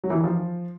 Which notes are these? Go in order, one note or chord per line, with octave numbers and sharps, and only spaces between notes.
F#3
E3
D#3
F3